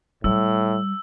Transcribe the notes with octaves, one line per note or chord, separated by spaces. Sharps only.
A2 G3 E6